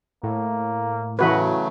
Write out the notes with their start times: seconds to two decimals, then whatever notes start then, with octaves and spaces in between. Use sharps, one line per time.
0.23 A2 A#3
1.19 C#3 E3 F#3 A3 F#4 B4